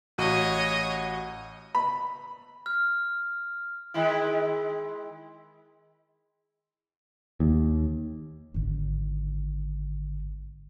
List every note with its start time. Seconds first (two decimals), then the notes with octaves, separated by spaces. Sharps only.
0.18 A1 F#4 C#5 D#5 D#7
1.75 B5
2.66 F6
3.94 D#3 G#3 E4
7.40 D#2
8.54 G#1 D3